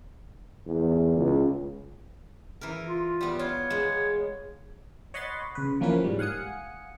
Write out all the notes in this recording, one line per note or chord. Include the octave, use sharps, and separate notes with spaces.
E2
C#2
E3 A#4
F4
G3 B3
F4 C#5
G#3 B3
C#5 D#5 F#5 B5 C6 A6
C#3 B4
E3 F3 A#3 B3 C#4 B4
G#2 G3
F5 F#5 G#5 D#6 C#7